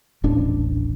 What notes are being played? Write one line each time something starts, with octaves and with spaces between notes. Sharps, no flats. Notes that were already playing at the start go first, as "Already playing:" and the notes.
D#1 A1 D4